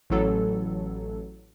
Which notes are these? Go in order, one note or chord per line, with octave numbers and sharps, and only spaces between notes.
A1 A2 F#3 A4